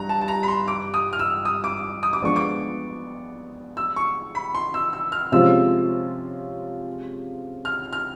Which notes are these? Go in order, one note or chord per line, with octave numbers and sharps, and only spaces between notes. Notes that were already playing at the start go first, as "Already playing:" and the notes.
Already playing: G2 A#5
A5
A5
A#5
B5
C6
D6
D#6
F6
E6
D#6
D6
D#6
D6
F3 G#3 B3 D4 C#6
D6
E6
C#6
B5
C6
E6
E6
F6
C3 F3 G#3 C#4 F4 E6
F6
F6